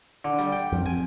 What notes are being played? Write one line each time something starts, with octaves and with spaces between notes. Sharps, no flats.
D3
G3
G5
F2
G#5